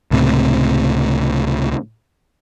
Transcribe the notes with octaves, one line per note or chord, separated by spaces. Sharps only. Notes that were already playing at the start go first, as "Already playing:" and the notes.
C#2 A2 C3